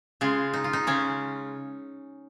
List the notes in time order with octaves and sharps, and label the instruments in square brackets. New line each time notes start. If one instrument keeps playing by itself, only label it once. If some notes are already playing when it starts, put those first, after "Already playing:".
[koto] C#3 G#3 F4
D#4
F4
D#4
C#3 G#3 C#4